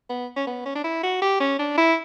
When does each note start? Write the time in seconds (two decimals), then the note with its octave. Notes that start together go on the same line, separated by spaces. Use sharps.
0.09 B3
0.36 C#4
0.47 B3
0.65 C#4
0.75 D4
0.84 E4
1.03 F#4
1.22 G4
1.40 C#4
1.59 D4
1.77 E4